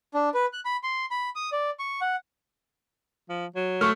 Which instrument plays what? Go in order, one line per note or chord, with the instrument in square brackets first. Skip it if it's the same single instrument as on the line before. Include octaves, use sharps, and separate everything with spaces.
[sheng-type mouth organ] D4
B4
F#6
B5
C6
B5
D#6
D5
C#6
F#5
[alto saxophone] F3
F#3
[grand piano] A3 [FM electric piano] C#6 F6